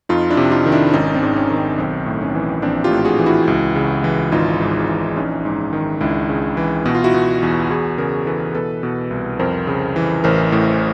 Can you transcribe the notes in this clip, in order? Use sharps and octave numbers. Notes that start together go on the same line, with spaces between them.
F2 D#4 F4
D4 E4
C3
D#4 F4
D#3
D4 E4
G#1 C#4 D#4
C4 D4
G#2
C#4
D#3
C#4
B1 C4
A2
C#4
E3
A#1 C4 D4
F4 G4
A2
F#4 G#4
E3
E4 F#4
C#2
C#3
E3
G#1 D#4 F4
G#2
E3
A#1 C#4 D#4
G#2
D#3
C#2 D4 E4
C#3
E3
B2 F#4
F4
E4 F#4
B2
E2
E2 F#4 G#4
C#3 G#4 A#4
E3 A4 B4
B2 A4 B4
B2
C2
F2 A#4 C5
C#3
E3
A1 A#4 C5
A2